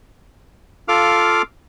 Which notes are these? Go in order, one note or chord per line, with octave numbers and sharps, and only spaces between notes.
F4 A4 F5 D6 F6